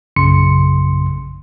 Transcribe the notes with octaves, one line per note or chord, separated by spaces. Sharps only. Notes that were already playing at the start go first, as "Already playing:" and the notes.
A#1 F#2 C#3 C6 C#7